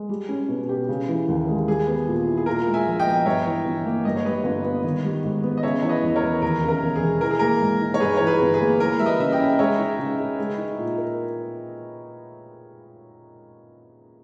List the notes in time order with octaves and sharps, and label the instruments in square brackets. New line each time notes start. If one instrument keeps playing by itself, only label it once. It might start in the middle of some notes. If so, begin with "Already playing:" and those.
Already playing: [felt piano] G#3
G3
C#4
B2
G4
C#3
E3
D#2
G#3
[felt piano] G3 [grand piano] G#4
[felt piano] B3
A#2
E4
[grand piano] G#4
[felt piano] A#2 [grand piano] A#4
[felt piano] G#3
[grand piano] E5 G#5
[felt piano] A#1
[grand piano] D#5 G5
[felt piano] B3
[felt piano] G2 [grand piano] C#5 E5
[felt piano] E3
G1
A#3
[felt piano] G2 [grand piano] D#5
[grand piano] C#5
[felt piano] G3 [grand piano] B4 D#5
[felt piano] G1
B3
D#3
G3
G#2
B3
[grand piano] D#5
[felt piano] C#3 [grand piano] C#5 E5
[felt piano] E3 [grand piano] C#5
[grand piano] B4 D#5
[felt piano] E2
[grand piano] A#4 C#5
[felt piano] E2
[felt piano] D#2 [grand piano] A#4
[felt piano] C#3
[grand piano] A#4
[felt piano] E1
[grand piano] G#4
[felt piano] E1
[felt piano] E3 [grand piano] A#4
[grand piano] G#4
[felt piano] A#3 [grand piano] A#4
[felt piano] G#2
D#4
[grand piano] C#5
[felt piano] G2 [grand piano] G#4 B4
[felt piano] E3 [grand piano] C#5
[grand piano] G#4 B4
[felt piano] G1
[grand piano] G#4 B4
[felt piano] A#3
[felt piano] E3 [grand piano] A#4
[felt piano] G3 [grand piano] E5
[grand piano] B4 D#5
[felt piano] C#3 [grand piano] E5
[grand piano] D#5 G5
[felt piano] C#4
[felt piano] G#3 [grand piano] C#5 E5
[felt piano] D#4
C#3
C#3
G#3
D#4
A#2
A#4